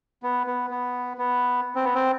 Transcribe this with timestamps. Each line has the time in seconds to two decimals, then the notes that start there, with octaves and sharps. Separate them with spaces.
0.23 B3
0.47 B3
0.70 B3
1.18 B3
1.75 C4
1.85 B3
1.95 C4